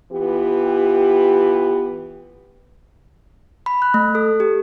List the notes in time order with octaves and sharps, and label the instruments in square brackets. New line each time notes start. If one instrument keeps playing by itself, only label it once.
[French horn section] E3 B3 F4 G4
[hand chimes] B5
F#6
A3
A4
G4